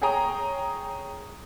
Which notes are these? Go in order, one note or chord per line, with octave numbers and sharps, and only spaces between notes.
G#4 C#5 G5 G#5 A#5 D#6